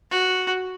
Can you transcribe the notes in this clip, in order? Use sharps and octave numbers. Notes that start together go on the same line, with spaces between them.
F#4